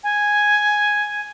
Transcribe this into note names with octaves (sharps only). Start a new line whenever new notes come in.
G#5